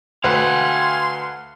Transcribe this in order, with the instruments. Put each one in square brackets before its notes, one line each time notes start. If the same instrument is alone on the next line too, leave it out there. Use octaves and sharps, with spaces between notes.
[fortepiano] D2 B4 [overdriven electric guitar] F5 F#5 [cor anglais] G#5 [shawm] C6